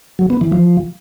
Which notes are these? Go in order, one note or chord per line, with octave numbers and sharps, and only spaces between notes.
F#3
B3
E3
F3